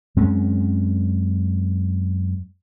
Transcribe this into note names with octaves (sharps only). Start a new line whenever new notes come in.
F#2 G#3 C4 C#4